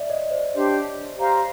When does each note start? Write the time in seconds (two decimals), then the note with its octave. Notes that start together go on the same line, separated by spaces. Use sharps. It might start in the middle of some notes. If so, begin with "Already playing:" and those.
Already playing: D5 E5
0.10 C#5 D#5
0.31 C5 D5
0.52 D4 G4 C5 C#5
1.17 G4 C5 F5 A#5